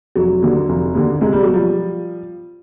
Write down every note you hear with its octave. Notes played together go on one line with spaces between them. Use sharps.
F1 F#3
D#2 D3
F1
D#2 D3
C2 G#3
G3
B2 F#3
F3 G3